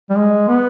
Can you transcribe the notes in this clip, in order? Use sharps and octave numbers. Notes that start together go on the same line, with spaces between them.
G3
G#3
B3